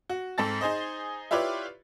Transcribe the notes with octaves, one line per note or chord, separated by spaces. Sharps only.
F#4
G#2 C4 A4 A6
D#4 G#4 C5 D#5
E4 F4 G4 B4 C#5 D5